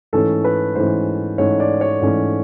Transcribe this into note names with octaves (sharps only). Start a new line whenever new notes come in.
G#2 E3 A3 C#4 A4
B4
G#2 E3 A3 C#4 C5
G#2 E3 A3 C#4 C#5
D5
C#5
G#2 E3 A3 C#4